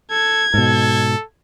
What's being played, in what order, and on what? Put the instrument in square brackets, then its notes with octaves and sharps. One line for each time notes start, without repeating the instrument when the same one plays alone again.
[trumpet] A4 [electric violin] G#6
[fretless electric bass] G#2 B2 [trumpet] A4